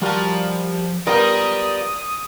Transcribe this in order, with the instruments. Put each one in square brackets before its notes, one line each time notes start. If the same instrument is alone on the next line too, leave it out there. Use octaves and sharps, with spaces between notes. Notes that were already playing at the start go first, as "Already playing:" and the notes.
[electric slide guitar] F3 A5 [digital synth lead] G3 [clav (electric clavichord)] F4 F#4 A#4
[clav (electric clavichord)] G3 B3 F4 [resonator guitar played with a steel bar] A#4 [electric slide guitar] D5 G5 [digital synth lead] D#6